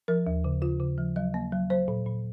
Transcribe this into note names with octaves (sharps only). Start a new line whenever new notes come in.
F3 A#4
D#2
C#3
C#3 F4
C#3
F3
F#3 D#5
A#3
F#3
F#3 C5
A#2
A#2